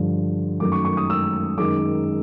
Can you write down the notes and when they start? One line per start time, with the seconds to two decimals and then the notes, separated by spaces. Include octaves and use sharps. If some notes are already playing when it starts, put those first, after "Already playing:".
Already playing: G2 D3 F3
0.60 F#2 D#3 F#3 A3 D6
0.72 C#6
0.85 C#6
0.97 D#6
1.10 E6
1.58 F#2 D#3 G#3 D6